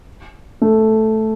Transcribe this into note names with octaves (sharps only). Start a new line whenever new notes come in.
A3